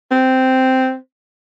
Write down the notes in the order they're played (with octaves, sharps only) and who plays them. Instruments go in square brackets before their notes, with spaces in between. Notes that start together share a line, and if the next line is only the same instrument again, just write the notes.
[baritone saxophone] C4